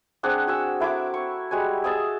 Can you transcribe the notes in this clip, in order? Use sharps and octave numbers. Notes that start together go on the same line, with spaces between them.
C4 D4 G#4 F#5
F#4 G#5 E6
A3 E4 A#5 D6
C#6
G3 G#3 F#4 G#5
G#4 D#5 E5 A5